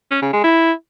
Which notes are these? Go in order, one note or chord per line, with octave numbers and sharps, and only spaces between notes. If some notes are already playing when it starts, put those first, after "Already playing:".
C#4
C#3
G#3
E4